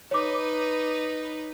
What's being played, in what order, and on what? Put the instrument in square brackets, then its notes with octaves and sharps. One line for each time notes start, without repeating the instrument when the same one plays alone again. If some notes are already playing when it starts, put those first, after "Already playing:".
[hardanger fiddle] D#4 B4 [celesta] C#5 D6